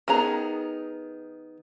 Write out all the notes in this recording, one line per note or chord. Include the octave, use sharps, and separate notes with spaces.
D#3 B3 G#4 A#5